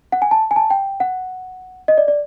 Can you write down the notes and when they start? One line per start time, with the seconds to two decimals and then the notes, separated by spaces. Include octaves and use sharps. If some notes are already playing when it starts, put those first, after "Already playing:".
0.12 F#5
0.22 G#5
0.31 A5
0.51 G#5
0.56 A5
0.70 G5
1.00 F#5
1.88 D#5
1.98 D5
2.08 D5